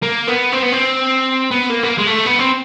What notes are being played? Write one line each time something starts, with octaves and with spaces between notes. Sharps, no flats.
A#3
B3
C4
B3
C4
B3
A#3
B3
A#3
G#3
A3
B3
C4